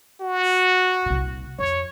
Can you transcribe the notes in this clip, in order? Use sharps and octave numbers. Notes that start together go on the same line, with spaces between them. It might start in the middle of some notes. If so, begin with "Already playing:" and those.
F#4
C2 A#2
F2 C#5